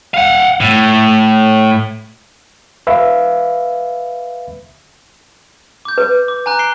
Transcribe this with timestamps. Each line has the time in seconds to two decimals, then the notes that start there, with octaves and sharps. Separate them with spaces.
0.14 F5 F#5
0.61 A2
2.87 B4 E5 F5 B5
5.85 D6 G6
5.98 B4
6.28 D6
6.46 G#5 A#5 F#6
6.59 C7 D7 G7